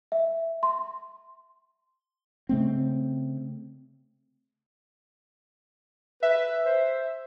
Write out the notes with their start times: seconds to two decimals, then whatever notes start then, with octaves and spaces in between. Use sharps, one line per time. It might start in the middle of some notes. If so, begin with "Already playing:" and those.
0.12 E5
0.63 C6
2.49 C#3 A3 C4
6.23 B4 E5
6.65 C5